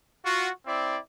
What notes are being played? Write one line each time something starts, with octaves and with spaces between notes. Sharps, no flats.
F4 F#4
C4 E4 D5